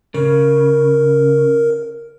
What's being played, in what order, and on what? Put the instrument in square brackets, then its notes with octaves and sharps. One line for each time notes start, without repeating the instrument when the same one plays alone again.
[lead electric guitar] C#3 [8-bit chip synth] A#4